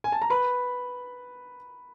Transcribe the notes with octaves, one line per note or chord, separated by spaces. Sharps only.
G#5
A5
A#5
B4 B5